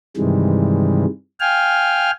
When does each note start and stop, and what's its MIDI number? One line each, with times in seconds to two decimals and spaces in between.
0.17 1.05 43
0.17 1.05 48
0.17 1.05 51
0.17 1.05 52
0.17 1.05 55
0.17 1.05 56
1.40 2.11 77
1.40 2.11 79
1.40 2.11 80
1.40 2.11 89